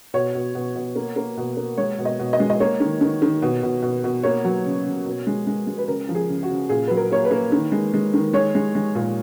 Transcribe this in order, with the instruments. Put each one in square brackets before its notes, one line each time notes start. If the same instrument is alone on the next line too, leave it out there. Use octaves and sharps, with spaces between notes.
[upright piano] B2 C#5
B2
B2
B2
A#3
A#3
B2
A#3
G#3 C#5
B2
D#5
B2
D#5
G#3
D#5
A#3 C#5
D#3
D#3
D#3
B2
B2
B2
B2
A#3 C#5
F#3
C#3
C#3
B2
G#3
G#3
G#3
B4
C#3 A#4
F3
G#4
C#3
F#4
C#3
A#2 G#4
F#3 B4
A#4
A#3 C#5
B4
A#3
D#3
G#3
G#3
D#3
G#3 C#5
G#3
G#3
A#2